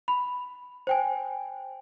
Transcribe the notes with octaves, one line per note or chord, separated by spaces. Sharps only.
B5
C5 G5 G#5